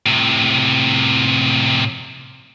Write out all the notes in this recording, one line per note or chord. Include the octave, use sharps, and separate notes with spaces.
A2 C3